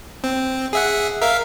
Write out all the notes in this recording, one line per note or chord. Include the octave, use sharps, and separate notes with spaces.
C4
G#4 E5 F#5
A#4 E5 F5